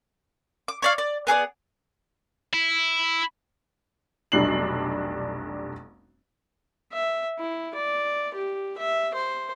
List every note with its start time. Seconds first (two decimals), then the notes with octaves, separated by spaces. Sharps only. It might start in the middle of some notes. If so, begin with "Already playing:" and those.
0.68 D6
0.82 C#5 D5 F5
0.98 D5
1.27 B3 G#4 A#4 D5
2.53 E4
4.32 F1 B1 G3 D4 C7 F#7
6.92 E5
7.39 E4
7.74 D5
8.35 G4
8.78 E5
9.14 C5